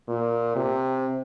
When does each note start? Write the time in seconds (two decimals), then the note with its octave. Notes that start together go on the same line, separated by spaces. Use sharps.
0.08 A#2
0.56 C3